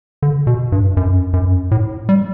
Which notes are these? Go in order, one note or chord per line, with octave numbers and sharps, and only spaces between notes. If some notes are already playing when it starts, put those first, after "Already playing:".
D3
B2
G2
F#2
F#2
A2
G3